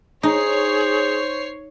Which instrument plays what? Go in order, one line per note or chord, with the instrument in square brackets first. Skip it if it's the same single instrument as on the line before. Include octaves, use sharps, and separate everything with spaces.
[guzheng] D#4 [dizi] G#4 [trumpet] C5 [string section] C#5 C7